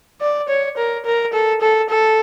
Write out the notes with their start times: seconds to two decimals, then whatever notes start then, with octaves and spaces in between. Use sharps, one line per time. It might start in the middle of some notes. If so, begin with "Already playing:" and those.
0.21 D5
0.49 C#5
0.77 A#4
1.06 A#4
1.33 A4
1.61 A4
1.89 A4